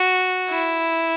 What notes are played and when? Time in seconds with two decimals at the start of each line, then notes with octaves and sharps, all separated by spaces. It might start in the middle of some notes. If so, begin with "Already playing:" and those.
Already playing: F#4
0.49 E4